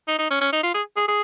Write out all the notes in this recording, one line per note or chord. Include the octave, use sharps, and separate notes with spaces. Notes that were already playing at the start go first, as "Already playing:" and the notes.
D#4
D#4
C#4
C#4
D#4
F4
G#4
G#4
G#4